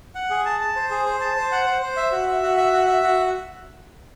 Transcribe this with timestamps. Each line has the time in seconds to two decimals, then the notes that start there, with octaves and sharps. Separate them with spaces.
0.15 F#5
0.30 G#4
0.45 A5
0.61 A5
0.76 C5
0.91 G#4
1.06 C5
1.21 A5
1.36 C5
1.52 F#5
1.66 C5
1.82 C5
1.97 E5
2.12 F#4
2.27 E5
2.43 F#4
2.57 E5
2.73 F#4
2.87 E5
3.03 F#4